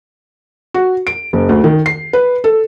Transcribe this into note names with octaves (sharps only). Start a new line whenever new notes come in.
F#4
D7
F#1
D2
D#3
C7
B4
A4